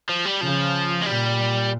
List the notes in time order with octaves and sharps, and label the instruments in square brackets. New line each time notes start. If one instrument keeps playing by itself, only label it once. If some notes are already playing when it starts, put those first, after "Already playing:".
[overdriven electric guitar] F3
G3
[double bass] C#3 [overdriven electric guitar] F3
[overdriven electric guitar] G#3
[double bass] A#2 [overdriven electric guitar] G3